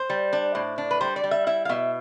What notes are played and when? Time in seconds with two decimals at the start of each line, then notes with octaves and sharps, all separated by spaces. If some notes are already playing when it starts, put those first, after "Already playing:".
Already playing: C5
0.10 G3
0.33 D4
0.55 A2
0.78 D4
0.91 B4
1.01 G3 C5
1.16 D5
1.24 G3
1.31 E5
1.47 E4 E5
1.65 F5
1.69 B2 E5